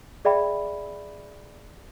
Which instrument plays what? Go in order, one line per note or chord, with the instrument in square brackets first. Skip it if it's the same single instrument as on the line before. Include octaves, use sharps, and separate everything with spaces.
[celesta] G#4 D5 E5 G5 B5